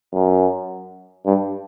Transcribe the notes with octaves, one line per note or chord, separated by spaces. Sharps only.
F#2
G2